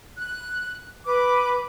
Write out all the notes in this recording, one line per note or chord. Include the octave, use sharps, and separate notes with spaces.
F#6
B4 D6